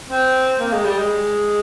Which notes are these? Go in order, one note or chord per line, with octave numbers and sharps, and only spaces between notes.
C4
A#3
G#3
G3
G#3